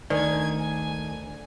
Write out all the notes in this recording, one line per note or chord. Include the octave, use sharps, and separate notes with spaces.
D2 D#3 D5 G#5 G#6
G#5